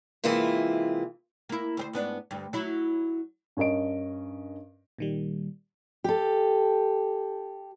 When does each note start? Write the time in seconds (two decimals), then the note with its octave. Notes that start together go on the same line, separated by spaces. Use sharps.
0.24 C3 E3 G#3 A#3 E4 F4
1.49 A#3 E4
1.77 D2 C4 C5
1.93 G#2 B3 D4
2.31 D2 G2
2.53 F#3 E4
3.57 G2 C#4 A#4 D#5 D7
4.98 A#2 D#3 G3
6.04 G4 A4